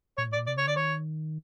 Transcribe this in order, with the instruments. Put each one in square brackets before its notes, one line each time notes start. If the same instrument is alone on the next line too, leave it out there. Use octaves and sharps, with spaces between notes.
[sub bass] A#2 [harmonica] C#5
[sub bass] A2 [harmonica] D5
[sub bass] A#2
[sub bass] C3 [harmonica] D5
[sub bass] C#3 [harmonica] C#5
[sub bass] D3 [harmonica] D5
[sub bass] D#3 [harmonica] C#5